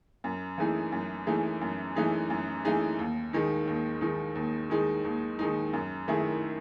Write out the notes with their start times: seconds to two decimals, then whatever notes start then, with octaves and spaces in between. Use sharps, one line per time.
0.24 F#2
0.58 E3 A3 D#4 G#4
0.92 F#2
1.27 E3 A3 D#4 G#4
1.61 F#2
1.96 E3 A3 D#4 G#4
2.30 F#2
2.65 E3 A3 D#4 G#4
2.99 D#2
3.33 D#3 G#3 D#4
3.67 D#2
4.01 D#3 G#3 D#4
4.35 D#2
4.70 D#3 G#3 D#4
5.05 D#2
5.39 D#3 G#3 D#4
5.73 F#2
6.08 D#3 A3 E4 G#4